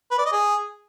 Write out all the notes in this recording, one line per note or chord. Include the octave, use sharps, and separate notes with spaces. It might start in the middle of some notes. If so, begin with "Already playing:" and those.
B4
D5
D#5
G#4